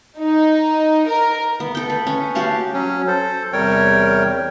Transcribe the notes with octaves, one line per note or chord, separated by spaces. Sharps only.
D#4
A#4
B3
A4 G5
B4
C#4
F#4 G4 F5 A5
F#3 C#4
A4 C5
E2 C3 G3 A#4 C#5 G5